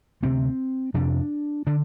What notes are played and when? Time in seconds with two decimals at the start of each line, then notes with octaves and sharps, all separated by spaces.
0.23 D2 C3 C4
0.94 F2 C3 D4
1.67 D3 D4